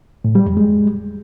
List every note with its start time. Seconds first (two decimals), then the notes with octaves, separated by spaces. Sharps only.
0.24 A2
0.35 G3
0.46 F2
0.57 G#3